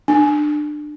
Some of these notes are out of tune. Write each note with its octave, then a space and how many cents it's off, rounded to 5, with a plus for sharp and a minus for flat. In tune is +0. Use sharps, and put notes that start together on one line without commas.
D4 +25